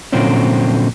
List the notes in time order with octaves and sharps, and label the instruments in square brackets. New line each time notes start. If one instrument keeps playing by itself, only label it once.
[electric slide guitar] A#2 D3 F3 F#3 C4 C#4